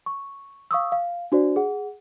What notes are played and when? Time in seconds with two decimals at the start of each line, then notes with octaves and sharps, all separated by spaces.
0.06 C#6
0.71 F5 C#6 D#6 E6
0.92 F5
1.32 D4 F#4 C5 D5
1.56 G#4 F#5